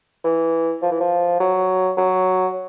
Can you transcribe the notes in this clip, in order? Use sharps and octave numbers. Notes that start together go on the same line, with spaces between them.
E3
F3
E3
F3
F#3
F#3